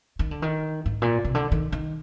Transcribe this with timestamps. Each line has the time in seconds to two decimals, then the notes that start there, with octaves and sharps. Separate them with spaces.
0.19 D#3
0.31 D3
0.42 D#3
0.86 G#2
1.02 A#2
1.25 C3
1.35 D3
1.52 D#3
1.72 D#3